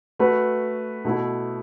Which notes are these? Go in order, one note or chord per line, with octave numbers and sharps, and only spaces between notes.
A3 F#4 B4
B2 A3 E4